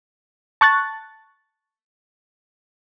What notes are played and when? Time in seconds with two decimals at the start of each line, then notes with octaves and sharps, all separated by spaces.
0.61 A5 C#6 F#6 A6